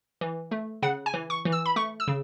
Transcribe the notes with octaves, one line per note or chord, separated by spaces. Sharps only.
E3
A3
C#3 F#5
G#5
E3
C#6
E3
E6
B5
A3 C#6
E6
C#3